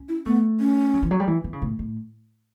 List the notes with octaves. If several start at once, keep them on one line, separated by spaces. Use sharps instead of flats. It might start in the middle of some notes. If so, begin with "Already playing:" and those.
Already playing: C#4
E4
A3 B3
C#4
F#3
E3
F#3
G3
E3
E3
C#3
A2
A2